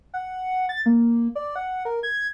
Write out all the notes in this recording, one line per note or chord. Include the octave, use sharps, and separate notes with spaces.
F#5
A6
A#3
D5
F#5
A#4
G#6